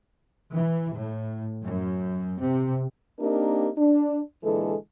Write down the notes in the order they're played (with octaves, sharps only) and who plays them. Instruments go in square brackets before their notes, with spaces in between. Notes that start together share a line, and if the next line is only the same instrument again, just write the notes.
[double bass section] E3
A2
F#2
C3
[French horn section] A#3 C4 D4 D#4 G4 A#4
D4
A#2 D3 E3 G#3 A4